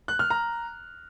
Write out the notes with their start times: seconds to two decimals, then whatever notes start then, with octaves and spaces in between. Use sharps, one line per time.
0.08 F#6
0.19 F6
0.30 A#5